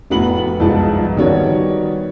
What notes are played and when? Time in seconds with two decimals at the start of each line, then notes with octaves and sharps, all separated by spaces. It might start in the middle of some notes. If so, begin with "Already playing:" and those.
0.10 F1 A2 B3 F#4 B5 F#7
0.60 C2 F2 G#2 F3 B3 A5
1.17 D#3 G3 B3 F#4 C#5 D5